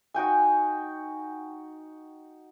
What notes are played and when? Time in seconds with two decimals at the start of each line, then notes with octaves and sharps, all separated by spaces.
0.14 D#4 F#4 G5 G#5